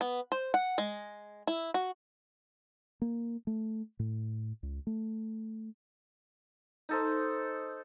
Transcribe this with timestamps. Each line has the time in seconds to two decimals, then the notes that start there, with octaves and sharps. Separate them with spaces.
0.01 B3
0.32 C5
0.54 F#5
0.78 G#3
1.47 E4
1.74 F#4
3.02 A#3
3.47 A3
3.99 A2
4.63 C#2
4.87 A3
6.89 D#4 A4 C5